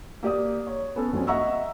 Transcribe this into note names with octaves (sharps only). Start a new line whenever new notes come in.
A#3 G4 D5 D#6
C#5
B3 C#4 A4
A#1 F#3 C4 C#4
D#5 E5 F#5 A#5 C#6 E6